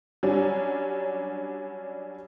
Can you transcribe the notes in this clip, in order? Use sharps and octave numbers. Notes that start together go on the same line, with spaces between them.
F#3 G3 C#4 D4